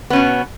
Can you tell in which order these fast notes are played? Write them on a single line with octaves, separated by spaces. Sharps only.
B3 C#4 B2